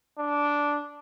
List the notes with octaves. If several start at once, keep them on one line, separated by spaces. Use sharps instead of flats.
D4